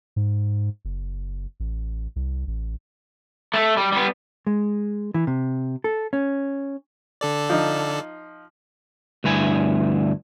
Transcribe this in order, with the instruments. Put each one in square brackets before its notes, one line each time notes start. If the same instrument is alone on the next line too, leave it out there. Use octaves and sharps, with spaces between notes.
[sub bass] G#2
F#1
A1
C2
A1
[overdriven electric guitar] A3 A4
G3
G3 B3
[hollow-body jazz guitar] G#3
E3
C3
A4
C#4
[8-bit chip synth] D3 A4 D5
[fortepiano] F3 D#4
[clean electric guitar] D2 G2 E4 G#5